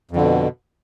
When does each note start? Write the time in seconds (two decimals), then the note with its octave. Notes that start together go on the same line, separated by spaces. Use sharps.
0.11 F2
0.16 D3
0.21 B2